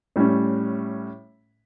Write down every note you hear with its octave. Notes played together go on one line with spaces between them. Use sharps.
A2 G3 C#4